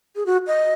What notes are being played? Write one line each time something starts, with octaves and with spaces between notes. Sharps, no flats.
G#4
F#4
D#5